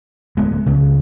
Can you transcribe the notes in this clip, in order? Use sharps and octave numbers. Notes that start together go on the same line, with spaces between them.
D1 G#3 B3
C#2 C#3